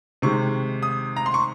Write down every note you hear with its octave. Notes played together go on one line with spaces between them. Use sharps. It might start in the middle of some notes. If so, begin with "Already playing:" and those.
C3 D#3 G#3 C#6
D#6
A#5
C6
C#6